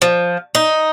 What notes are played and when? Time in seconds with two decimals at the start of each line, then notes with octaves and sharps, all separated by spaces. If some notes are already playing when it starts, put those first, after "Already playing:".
0.02 F3
0.55 D#4